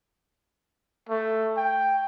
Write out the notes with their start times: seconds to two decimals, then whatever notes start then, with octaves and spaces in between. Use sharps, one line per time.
1.09 A3
1.57 G5